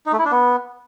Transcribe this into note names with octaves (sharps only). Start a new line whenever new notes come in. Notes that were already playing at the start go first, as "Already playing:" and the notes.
D#4
A3
E4
D4
B3